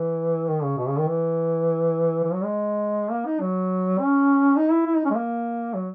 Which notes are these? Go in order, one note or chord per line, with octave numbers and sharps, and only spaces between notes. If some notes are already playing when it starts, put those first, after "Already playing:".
Already playing: E3
D#3
C#3
B2
C#3
D#3
E3
E3
F#3
G#3
A#3
D#4
F#3
C#4
D#4
E4
E4
D#4
C#4
G#3
A#3
F#3